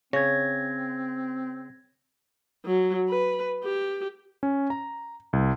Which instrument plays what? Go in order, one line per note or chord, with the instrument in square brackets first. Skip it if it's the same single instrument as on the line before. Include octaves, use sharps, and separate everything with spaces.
[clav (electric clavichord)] C#3 [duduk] C4 [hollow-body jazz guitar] C#5 [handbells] G#6 A#6
[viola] F#3
B4
G4
[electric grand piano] C#4
A#5
C2